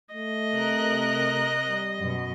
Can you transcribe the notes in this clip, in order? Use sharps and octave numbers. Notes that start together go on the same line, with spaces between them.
A3 D#5
C3 A#4 F#6
G3
F#2 B2